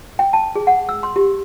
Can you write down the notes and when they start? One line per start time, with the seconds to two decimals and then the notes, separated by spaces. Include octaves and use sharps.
0.19 G5
0.33 A5
0.55 G#4
0.67 F#5
0.89 E6
1.03 C6
1.16 G4